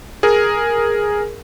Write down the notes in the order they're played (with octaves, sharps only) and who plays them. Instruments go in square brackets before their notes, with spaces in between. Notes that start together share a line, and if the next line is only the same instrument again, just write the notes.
[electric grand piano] G#4 A#4